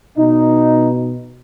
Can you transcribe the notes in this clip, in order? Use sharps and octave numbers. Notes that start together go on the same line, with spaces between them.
B2 D#4